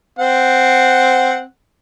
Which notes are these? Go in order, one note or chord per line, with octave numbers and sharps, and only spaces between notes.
C4 F#5